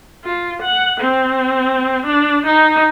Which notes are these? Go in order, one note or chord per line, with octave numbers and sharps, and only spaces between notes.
F4
F#5
C4
D4
D#4